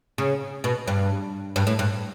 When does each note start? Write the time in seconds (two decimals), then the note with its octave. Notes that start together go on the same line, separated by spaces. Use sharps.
0.18 C#3
0.64 B2
0.87 G2
1.56 G2
1.67 A2
1.79 G2